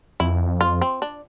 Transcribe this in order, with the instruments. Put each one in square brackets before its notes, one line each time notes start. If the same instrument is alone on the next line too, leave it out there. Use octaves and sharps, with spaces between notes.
[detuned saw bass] F2 [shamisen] E4
[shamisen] F4
C4
D4